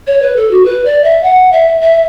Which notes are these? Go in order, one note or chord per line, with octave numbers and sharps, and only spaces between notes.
C#5
B4
A4
F#4
B4
D5
E5
F#5
E5
E5